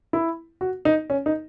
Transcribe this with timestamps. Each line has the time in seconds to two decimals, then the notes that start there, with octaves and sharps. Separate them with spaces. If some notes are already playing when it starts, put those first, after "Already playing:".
0.13 E4
0.61 F#4
0.85 D#4
1.10 C#4
1.26 D#4